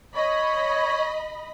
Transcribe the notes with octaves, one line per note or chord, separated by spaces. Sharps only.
C#5 D#5 B5